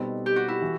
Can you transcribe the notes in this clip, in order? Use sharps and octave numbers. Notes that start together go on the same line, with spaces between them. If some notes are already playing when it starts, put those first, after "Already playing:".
Already playing: B2 G3 C4 D#4 A4 B4
G4
F#4
E4
E3